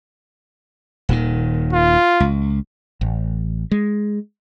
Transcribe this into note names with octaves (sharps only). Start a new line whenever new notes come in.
D#1 A#2 D#3
F4
C#2
A1
G#3